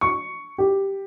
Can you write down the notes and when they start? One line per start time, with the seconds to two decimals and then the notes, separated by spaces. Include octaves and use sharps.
0.01 C#6
0.58 G4